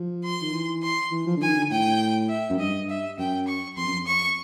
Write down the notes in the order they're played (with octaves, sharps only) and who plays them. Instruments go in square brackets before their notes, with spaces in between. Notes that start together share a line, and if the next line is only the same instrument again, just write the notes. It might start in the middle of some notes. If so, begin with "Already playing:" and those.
Already playing: [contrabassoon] F3
[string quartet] C6
[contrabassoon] D#3
E3
[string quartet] C6
[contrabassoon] E3
F3
D3
[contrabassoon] D#3 [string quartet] G#5
[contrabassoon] D3
[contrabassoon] A2 [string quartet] G5
[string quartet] E5
[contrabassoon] F#2
[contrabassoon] G2 [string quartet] D#5
[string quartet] E5
[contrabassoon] F#2 [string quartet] G5
[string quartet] C#6
[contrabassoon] F2 [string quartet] C6
[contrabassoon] F#2
F2
[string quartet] C#6